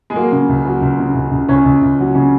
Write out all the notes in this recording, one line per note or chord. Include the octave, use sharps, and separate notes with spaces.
G#3
F#3 A#3
C#3
C#2
F#3
C#2
C#3
C#2
C#2
C#2 C#4
C#2
C#2
F#3
C#3